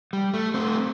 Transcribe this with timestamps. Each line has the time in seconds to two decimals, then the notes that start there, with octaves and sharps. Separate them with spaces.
0.13 G3
0.34 A3
0.54 A3 C4